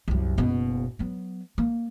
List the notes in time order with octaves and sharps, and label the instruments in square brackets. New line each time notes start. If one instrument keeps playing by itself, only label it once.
[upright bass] C2 F#2
F#1 B2
F#3 B3
A#3